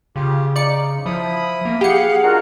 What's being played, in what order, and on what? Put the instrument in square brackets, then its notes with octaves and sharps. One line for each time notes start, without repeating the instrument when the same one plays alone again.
[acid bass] C#3 [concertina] F4 G4
[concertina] D#4 [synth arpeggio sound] D5 C#7
[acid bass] F3 [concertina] E4 B5 D#6
[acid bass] A#3
[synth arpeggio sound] G4 C#7 [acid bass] G#4 [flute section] F5 F#5
[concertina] D4 D#4 C#5 [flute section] F4 F#4 A#4